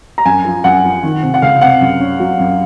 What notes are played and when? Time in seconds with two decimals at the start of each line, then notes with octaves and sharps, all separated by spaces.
0.18 A#5
0.25 F#2 G#5
0.45 F3
0.64 F#2 F#5
0.84 F3
1.03 D#3
1.23 C3
1.34 F#5
1.42 C#2 F5
1.61 C3 F#5
1.81 F#2
2.00 C#4
2.20 F#3
2.39 F#2